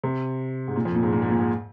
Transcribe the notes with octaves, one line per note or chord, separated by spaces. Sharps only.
C3
G#2
A#2
F2
A#2
G#2
A#2
G#2
A#2
G#2